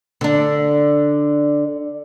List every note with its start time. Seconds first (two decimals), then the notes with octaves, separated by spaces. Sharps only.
0.21 D3 D4